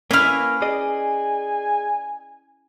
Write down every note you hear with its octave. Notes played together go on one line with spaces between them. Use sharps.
A#3 C#4 E4 B4 F6
G#4 D5 D#5 G#5